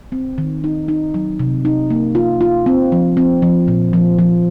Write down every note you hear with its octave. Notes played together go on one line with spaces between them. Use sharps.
C4
D#3
D#4
D#4
F#3
C3
D#4
A#3
F4
F4
C4
F3
C4
F3
A#2
F3
F3